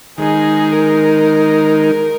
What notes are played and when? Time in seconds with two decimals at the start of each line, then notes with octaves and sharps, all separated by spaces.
0.18 D#3 G#3 D#4 G#4
0.72 A#4